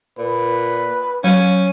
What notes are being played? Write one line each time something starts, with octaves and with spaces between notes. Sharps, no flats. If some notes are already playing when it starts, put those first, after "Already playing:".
A#2 B4
F#3 C#4